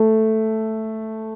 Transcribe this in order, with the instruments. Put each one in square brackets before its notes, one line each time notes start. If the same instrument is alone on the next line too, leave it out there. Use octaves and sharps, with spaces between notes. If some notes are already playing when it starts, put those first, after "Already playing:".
Already playing: [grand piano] A3